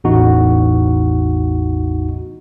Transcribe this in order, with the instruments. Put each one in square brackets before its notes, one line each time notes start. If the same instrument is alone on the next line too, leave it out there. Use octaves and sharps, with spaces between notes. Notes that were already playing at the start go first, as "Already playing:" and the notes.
[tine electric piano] A1 E2 D#4 F#4